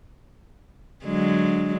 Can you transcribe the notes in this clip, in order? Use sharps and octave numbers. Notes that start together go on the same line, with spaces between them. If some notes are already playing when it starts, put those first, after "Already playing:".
D3 F#3 G#3